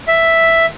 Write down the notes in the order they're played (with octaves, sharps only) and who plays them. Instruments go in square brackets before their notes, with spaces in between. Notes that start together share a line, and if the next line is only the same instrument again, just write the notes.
[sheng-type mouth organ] E5